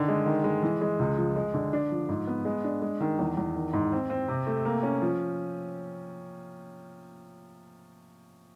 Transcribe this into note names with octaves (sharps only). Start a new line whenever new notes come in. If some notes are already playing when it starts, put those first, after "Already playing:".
Already playing: D3 D#3
G#3
D#3
G#3
E3
G#3
C#2
F3
G#3
D3
D4
F3
G#2
B3
G#3
D4
G#3
D#3
E2
E2
D#3
G#2
C4
C4
C3
A3
A#3
C#4
F3